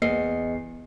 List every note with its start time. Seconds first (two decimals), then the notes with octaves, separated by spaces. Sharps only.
0.02 E2 A#3 D#5 C7 C#7